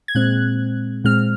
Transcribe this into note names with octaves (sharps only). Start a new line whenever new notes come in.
G#6
A#2 G#3 C4 F#6
A#2 G#3 C4 F6